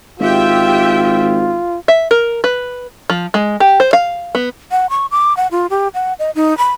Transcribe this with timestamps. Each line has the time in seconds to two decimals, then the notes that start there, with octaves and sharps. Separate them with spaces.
0.20 G#1 F4 G4 E5 G5
1.88 E5
2.11 A#4
2.44 B4
3.10 F3
3.34 G#3
3.60 G4
3.80 C5
3.93 F5
4.35 B3
4.71 F#5
4.90 C#6
5.11 D6
5.37 F#5
5.51 F4
5.70 G4
5.94 F#5
6.19 D#5
6.35 D#4
6.58 B5